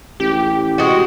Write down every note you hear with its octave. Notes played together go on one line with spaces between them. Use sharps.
A1 G4
G#3 F#4